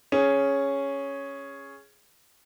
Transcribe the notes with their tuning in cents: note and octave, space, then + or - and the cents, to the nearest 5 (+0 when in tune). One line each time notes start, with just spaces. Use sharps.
C#4 +0 G#4 +0